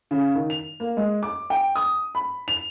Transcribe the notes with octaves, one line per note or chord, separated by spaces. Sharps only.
C#3
D#3
F7
A#3
G#3
D6
G5
D#6
B5
F7